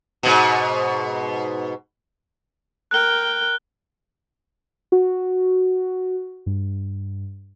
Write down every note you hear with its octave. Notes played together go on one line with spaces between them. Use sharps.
G#2 B2
A#4 G5 F#6 G7
F#4
G2